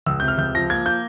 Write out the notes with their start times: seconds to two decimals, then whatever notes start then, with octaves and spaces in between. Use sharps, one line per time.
0.06 C#2 E6
0.20 G6
0.22 C3
0.28 F6
0.38 C#2 G6
0.55 F3 A#6
0.70 A#3 G#6
0.86 A#3 G6